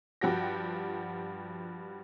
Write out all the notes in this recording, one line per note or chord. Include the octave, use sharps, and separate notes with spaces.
G2 F3 F#4 G4 G5 A#6